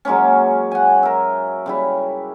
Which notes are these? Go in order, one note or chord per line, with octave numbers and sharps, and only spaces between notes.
F#3 G#3 A#3 C#4
F#5 G#5
A#4 E5
C#3 G3 E4